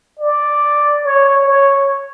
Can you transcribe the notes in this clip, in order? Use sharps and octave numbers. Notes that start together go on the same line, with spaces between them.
D5
C#5
C#5